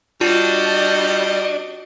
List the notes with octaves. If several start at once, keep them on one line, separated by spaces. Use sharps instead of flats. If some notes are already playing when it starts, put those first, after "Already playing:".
G3 D4 F4 F#4 D#5